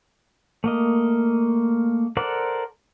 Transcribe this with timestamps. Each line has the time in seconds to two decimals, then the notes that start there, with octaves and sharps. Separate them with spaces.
0.64 A3 A#3 D#5
2.17 A4 A#4 C5 D5 F#5